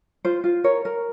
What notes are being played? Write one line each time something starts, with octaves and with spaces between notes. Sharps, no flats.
F4 C5
F4
A#4 C#5
A#4